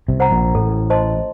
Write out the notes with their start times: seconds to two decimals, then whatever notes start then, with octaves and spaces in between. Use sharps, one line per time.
0.08 C2 C3
0.20 C5 F#5 A#5
0.31 A#1 A#2
0.55 A1 A2 A4
0.90 C5 D#5 A5 C6